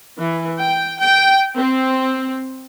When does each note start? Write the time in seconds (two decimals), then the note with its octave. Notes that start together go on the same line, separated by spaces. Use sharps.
0.17 E3
0.59 G5
1.00 G5
1.55 C4